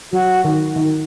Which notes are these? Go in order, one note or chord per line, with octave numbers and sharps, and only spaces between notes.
F#3 F#4
D#3
D#3